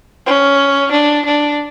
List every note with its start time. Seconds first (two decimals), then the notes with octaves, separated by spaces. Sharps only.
0.26 C#4
0.92 D4
1.25 D4